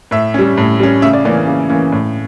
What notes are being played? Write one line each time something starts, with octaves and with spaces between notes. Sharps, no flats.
A2 E5
G3 C#4
A2
G3 C#4
C#3 E5
D5
E3 A#3 C#4 D5
C#3
E3 A#3 C#4
A2